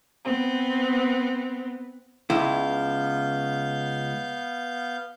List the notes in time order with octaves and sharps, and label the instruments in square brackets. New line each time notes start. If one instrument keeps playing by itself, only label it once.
[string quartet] B3 C4
[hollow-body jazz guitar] C#2 E4 [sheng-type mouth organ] B3 F5 G6